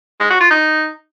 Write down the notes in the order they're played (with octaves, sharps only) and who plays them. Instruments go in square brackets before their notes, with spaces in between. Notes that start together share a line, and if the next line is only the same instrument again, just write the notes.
[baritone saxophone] G#3
F#4
F4
D#4